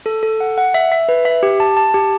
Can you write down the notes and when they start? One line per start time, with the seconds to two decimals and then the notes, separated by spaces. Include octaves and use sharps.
0.06 A4
0.23 A4
0.40 F#5
0.58 F#5
0.74 E5
0.92 E5
1.09 B4
1.25 E5
1.43 G4
1.60 A5
1.77 A5
1.94 G4